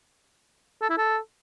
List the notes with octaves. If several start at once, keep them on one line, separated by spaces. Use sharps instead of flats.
A4
E4
A4